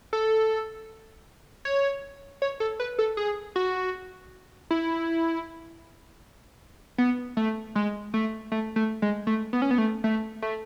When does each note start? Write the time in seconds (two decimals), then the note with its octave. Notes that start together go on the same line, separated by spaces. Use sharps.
0.13 A4
1.65 C#5
2.42 C#5
2.60 A4
2.80 B4
2.99 A4
3.17 G#4
3.56 F#4
4.71 E4
6.98 B3
7.37 A3
7.75 G#3
8.14 A3
8.52 A3
8.76 A3
9.02 G#3
9.27 A3
9.53 B3
9.62 C#4
9.71 B3
9.78 A3
10.04 A3
10.42 A3